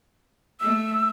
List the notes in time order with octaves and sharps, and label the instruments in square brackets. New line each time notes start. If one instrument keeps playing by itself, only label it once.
[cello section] A3 [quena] E6